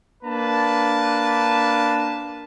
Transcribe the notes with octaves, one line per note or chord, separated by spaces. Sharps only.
A#3 D4 B4 A5